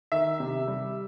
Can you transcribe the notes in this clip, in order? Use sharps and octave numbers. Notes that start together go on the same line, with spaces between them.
D#3 E5
C3
G3